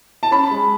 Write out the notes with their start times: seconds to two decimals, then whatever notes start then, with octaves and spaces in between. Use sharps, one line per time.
0.23 A5
0.31 C#4 B5
0.51 G#3